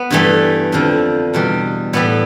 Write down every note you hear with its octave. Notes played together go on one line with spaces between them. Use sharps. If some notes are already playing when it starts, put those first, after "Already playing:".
Already playing: B3
G2 E3 G3 A3
F2 D3 F3
E2 B2 G3
A2 E3 G3 B3